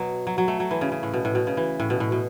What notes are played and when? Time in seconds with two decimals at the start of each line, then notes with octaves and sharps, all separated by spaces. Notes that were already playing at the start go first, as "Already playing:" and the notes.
Already playing: B2 F#3
0.27 F#3
0.38 F#3
0.48 A3
0.60 F#3
0.71 E3
0.81 C#3
0.92 C#3
1.03 A2
1.14 B2
1.25 A2
1.35 B2
1.47 C#3
1.57 E3
1.80 A2
1.90 B2
2.00 A2
2.12 B2